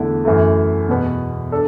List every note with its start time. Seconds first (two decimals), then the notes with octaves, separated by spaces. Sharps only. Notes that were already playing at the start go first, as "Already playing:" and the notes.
Already playing: E2 D3 A3 E4
0.25 F#2 E3 A3
0.89 E2 B2 B3
1.52 D4 A4